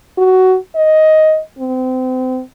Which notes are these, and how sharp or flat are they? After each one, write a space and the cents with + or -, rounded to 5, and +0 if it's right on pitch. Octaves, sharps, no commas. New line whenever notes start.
F#4 +15
D#5 +10
C4 -30